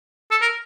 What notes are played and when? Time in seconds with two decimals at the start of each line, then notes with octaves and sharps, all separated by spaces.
0.31 A4
0.42 A#4